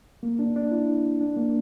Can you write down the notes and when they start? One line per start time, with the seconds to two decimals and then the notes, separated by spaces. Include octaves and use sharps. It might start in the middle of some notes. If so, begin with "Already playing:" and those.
0.23 A#3
0.39 D4
0.56 D4
0.71 E4
1.21 D4
1.36 A#3